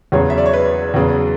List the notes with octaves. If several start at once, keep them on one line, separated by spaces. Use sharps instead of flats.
E2 C#3 F#3 C#5
E5
D5
C#5
B4
E2 C#3 F#3